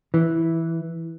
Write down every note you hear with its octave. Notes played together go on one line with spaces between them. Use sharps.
E3